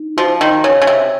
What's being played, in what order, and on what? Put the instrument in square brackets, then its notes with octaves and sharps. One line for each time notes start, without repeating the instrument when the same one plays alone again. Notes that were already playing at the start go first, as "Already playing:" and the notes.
Already playing: [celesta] D#4
[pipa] F3 [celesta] F#4
[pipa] D#3
[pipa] C#3 [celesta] C#5
[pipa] C#3
C3